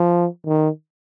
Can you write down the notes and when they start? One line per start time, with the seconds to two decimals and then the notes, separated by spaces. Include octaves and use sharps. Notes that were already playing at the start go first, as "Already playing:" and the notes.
Already playing: F3
0.46 D#3